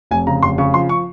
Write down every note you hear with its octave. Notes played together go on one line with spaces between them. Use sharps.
F1 G#5
C#3 A#5
F1 C6
C#3 C#6
F3 C6
C#6